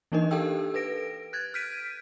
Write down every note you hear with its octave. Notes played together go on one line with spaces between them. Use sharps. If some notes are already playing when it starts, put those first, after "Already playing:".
E3 A#3 D4 D#4 A#4 D#5
G4 A4 A#4 F5 G5 E6
A4 B4 A#6 D7
F#6 G#6 A6
F6 G6 B6 D7 D#7